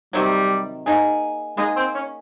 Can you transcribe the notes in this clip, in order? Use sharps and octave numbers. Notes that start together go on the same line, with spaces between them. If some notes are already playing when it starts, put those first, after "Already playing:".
C3 D#3 F#3 G3
A#3 D#4 G#4
G#3 A#3 D#4 G#4
C4
C#4